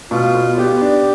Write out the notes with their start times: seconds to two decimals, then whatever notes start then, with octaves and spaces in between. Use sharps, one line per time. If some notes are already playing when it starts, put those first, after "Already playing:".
0.11 B2 F4
0.35 B3
0.58 B3 G4
0.81 D4